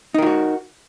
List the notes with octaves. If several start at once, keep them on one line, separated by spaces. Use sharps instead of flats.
D#4 F4 F#4 A#4